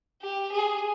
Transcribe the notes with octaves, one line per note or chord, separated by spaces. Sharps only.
G4
G#4